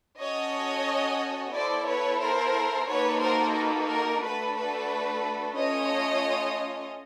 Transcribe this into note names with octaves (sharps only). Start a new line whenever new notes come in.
C#4 F#4 A4 C#5 D#5
B3 E4 A4 C5 D5
B4 C#5
A#4 C5
A#3 D#4 F#4 A4 B4 C#5
A#4 C5
B4
A#4
A3 D4 F#4 A4 B4
B4
A3 C#4 F4 C#5 D#5